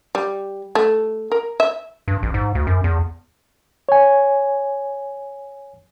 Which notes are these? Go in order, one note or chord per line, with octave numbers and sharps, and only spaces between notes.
G3
A3
A#4
E5
G2
A1
G#2
D2
F#2
E2
C#5 G#5